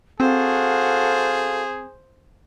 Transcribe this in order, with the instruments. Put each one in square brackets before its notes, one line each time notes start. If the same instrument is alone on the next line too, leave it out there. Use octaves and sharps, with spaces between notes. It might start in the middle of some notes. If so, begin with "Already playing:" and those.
[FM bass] C4 [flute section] F#4 A4 F5 [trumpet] G#4 [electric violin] C5